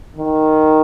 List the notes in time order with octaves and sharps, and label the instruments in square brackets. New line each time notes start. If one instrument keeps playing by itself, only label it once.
[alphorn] D#3